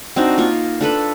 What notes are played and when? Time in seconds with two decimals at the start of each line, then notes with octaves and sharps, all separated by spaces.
0.16 C4 D4 D#4 F#4
0.38 A#3 F4 C#6
0.81 D4 A4 B4 B5